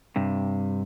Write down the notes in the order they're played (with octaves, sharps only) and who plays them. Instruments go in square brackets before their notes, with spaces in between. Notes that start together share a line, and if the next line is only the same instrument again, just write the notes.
[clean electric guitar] G2 C3